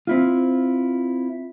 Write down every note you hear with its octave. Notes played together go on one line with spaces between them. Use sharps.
C4 E4 F4